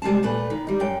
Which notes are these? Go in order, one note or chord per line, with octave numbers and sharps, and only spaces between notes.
C3 G3 G#3 F4 A5
A#2 A3 B4
D#3
G3 D#4
F#2 G5